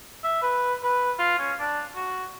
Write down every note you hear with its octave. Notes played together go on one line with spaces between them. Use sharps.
E5
B4
B4
F4
C#4
D4
F#4